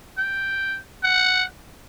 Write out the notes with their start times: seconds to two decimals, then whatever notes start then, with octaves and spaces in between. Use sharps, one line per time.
0.18 G5
1.03 F#5